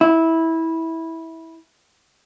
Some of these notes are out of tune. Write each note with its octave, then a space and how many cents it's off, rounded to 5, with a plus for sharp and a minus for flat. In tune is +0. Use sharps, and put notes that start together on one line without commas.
E4 -15